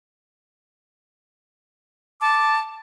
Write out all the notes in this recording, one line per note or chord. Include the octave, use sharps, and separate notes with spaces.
A5 D6